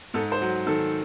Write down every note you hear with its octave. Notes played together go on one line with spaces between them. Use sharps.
G#2 A4
C5
F#3
D#3 A4